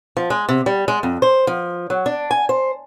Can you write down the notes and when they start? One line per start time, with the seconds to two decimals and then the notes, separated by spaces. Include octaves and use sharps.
0.17 F3
0.30 G#3
0.49 C3
0.66 G3
0.88 G#3
1.03 F2
1.22 C5
1.47 F3
1.90 F#3
2.06 D4
2.31 G#5
2.49 C5